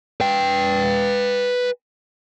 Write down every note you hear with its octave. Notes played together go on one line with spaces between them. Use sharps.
B4 G5